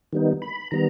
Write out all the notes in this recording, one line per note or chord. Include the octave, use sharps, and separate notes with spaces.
D#3 G3 B3 D#4
B5
D#3 G3 B3 A#5